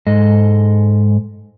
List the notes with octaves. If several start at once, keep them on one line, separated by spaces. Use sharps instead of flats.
G#2 G#3 A4 D#5